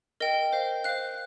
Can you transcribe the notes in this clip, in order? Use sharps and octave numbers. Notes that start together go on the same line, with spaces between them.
A#4 D#5 G5
C5 F5
C5 F5 F#6